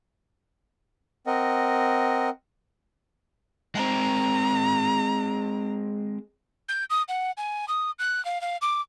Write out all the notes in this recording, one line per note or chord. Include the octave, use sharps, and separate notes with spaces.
C4 A#4 D#5 F#5
G#3 C4 A#5
G6
D#6
F#5
G#5
D#6
F#6
F5
F5
D6